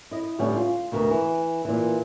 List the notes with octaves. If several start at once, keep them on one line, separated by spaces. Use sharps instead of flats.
E4 D#5
A2 D3 G3 B3 C#4
F4
D2 B2 A#4
E3
A#2 E3